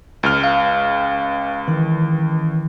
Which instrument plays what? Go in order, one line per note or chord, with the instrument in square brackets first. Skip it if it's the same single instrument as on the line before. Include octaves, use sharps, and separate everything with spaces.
[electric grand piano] C#2 G5 F6
[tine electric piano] F5
D#3 E3